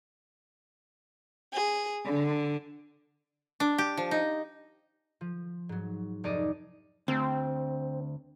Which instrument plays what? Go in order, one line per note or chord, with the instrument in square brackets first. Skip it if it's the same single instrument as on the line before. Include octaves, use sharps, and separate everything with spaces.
[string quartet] G#4
D3
[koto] D4
G4
F3
D#4
[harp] F3
G#2 F#3
F1 D#4 D5 D#5 D6
[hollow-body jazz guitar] D2 [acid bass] C4